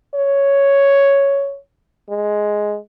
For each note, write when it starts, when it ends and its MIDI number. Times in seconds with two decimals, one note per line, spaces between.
0.15 1.58 73
2.10 2.77 56